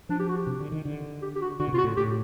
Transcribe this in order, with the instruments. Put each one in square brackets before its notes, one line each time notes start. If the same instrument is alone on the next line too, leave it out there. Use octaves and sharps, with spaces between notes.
[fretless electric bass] F3 [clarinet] D4
[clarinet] G4
F#4
G4
[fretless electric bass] C3
D3
D#3
D3
[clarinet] G4
G4
F#4
[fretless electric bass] D3 [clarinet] F#4
[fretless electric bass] B2
[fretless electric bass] C3 [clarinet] F4
[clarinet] F#4
[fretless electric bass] A2
[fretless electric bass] A2 [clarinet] G4